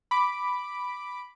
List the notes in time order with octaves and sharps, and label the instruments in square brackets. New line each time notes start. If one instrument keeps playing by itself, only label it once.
[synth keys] B5 D6